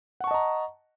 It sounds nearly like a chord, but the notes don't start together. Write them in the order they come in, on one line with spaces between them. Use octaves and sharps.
F#5 C#6 A5 D#5 A#5